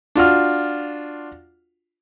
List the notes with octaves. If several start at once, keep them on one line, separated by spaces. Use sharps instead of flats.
D4 F4 F#4 F6